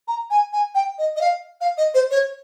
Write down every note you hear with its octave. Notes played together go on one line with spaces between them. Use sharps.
A#5
G#5
G#5
G5
D#5
D#5
F5
F5
D#5
C5
C#5